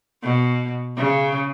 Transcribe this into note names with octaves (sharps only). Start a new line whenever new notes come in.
B2
C#3